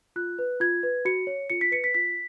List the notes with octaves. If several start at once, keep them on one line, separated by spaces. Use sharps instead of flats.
F4 F#6
B4
F4 G#6
B4
F#4 C#7
C#5
F4 C#7
B6
B4 C#7
B6
F4 B6